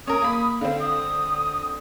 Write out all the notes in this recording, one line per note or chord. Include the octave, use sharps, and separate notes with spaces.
C#4 A#4 D#6
A#3 B5
D3 C4 F5
D#6